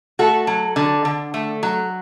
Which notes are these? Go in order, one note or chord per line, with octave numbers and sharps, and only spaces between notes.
A3 F#4 A4
F#3
D3
D3
A3
F#3